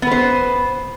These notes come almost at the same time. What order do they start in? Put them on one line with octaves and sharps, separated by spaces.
B3 B4 C5